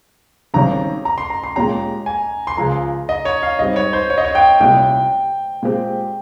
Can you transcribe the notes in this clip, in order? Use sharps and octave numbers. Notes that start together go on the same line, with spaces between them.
G#1 G#2 D#3 G3 C#4 A#5
A#5
C6
A#5
C6
A#2 G#3 C#4 G4 A#5
G#5
C6
C#2 C#3 F3 A#5
D#5
C#5
F5
G#2 G3 C4 D#5
C#5
C5
C#5
D#5
C#5
G5
C2 A#2 G3 C#4 G5
A#2 G#3 C4 G4